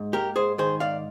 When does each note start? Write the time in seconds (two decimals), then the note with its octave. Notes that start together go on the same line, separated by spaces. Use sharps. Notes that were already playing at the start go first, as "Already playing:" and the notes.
Already playing: G#2
0.13 A#3 G4 A#4
0.36 G#2 G#4 C5
0.58 D#3 G#4 C5
0.80 G#2 D5 F5